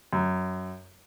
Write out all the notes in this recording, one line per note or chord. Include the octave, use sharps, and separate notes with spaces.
F#2